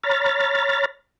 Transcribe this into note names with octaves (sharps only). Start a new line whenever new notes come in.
C#5 A#5 B5 F6 A6